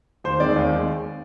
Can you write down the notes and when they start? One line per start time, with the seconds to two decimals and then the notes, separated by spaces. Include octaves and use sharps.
0.24 D#2 C5
0.40 D#3 G#3 C4 D5
0.56 D#2
0.71 D#3 G#3